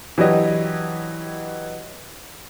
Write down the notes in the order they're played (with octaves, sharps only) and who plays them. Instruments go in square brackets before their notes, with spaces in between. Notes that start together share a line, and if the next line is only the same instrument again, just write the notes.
[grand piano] E3 F#3 D4 G4 D#5